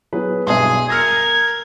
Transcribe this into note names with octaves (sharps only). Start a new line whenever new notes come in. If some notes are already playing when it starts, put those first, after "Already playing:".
F#3 B3 E4 G#4 B4
B1 G2 B2 G#4 E5 C6
A#4 E6 F6 G#6 A#6 C#7